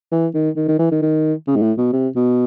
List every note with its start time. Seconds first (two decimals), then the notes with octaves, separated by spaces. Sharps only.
0.12 E3
0.34 D#3
0.56 D#3
0.68 D#3
0.79 E3
0.91 D#3
1.02 D#3
1.47 C#3
1.56 G#2
1.62 A2
1.78 B2
1.93 C3
2.16 B2